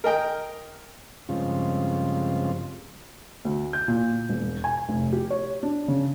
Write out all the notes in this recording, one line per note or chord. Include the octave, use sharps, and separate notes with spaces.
A#4 D#5 G5
G2 C#3 F3 G#3 C4 F4
D2
G6
A#2
E1
G#5
F1
G4
C#5
D4
C#3